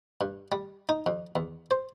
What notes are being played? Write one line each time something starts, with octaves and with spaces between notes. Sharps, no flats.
G2
G3
D#4
F2
E2
C5